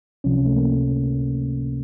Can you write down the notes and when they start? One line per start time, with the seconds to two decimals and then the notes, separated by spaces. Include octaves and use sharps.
0.24 C#2 C3 F3 C#4
0.46 A3
0.56 A#3